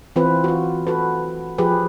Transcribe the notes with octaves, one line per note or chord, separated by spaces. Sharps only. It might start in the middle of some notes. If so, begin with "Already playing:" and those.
E3 C4 F4 B4
F4 F#4
F#4 A4 B4
F3 G4 G#4 B4